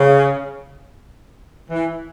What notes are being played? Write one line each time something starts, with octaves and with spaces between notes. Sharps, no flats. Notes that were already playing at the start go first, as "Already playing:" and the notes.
Already playing: C#3
E3